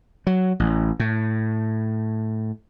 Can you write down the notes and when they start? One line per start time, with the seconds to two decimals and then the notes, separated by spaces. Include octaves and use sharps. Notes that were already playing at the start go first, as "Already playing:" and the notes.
0.27 F#3
0.60 A1
1.00 A2